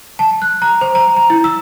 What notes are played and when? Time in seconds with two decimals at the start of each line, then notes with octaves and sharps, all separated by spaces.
0.19 A5
0.42 F#6
0.62 A#5
0.81 C5
0.95 A#5
1.17 A#5
1.30 E4
1.44 E6